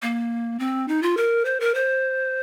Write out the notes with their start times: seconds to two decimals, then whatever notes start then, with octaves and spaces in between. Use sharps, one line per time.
0.02 A#3
0.59 C4
0.88 D#4
1.03 F4
1.17 A#4
1.45 C5
1.60 A#4
1.75 C5